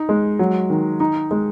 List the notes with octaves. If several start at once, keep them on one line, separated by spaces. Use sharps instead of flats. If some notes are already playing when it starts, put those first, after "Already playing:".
Already playing: D#4
G#3
F#3
D#3
D#4
G#3